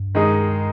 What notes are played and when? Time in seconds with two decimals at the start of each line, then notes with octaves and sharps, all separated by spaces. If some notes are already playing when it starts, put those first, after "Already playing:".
Already playing: G2
0.15 D#3 G#3 D#4 G#4